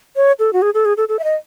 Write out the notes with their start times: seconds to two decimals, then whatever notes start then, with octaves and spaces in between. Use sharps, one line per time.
0.16 C#5
0.39 A4
0.53 F#4
0.62 G#4
0.74 A4
0.85 G#4
0.97 A4
1.09 A4
1.19 E5
1.24 D#5